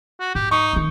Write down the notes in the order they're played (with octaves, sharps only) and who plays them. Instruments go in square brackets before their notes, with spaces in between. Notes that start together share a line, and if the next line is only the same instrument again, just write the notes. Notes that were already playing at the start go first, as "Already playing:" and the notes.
[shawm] F#4
[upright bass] G#2 [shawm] G4
[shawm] D#4 [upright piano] C#6
[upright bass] D#3 A3